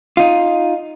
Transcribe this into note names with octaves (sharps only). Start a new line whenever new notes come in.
D#4 F4